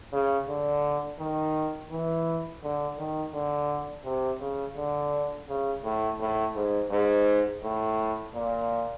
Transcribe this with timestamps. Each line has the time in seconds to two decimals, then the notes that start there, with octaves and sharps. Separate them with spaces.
0.13 C#3
0.48 D3
1.19 D#3
1.91 E3
2.63 D3
2.98 D#3
3.34 D3
4.05 C3
4.41 C#3
4.76 D3
5.49 C#3
5.84 A2
6.21 A2
6.55 G#2
6.91 G#2
7.63 A2
8.35 A#2